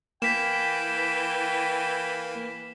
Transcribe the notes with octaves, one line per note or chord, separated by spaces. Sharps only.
E3 A#3 G5 B6 E7